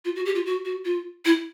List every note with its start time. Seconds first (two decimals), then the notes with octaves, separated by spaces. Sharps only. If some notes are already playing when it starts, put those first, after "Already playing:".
0.05 F4
0.16 F#4
0.26 G4
0.35 F4
0.46 F#4
0.65 F#4
0.85 F4
1.25 E4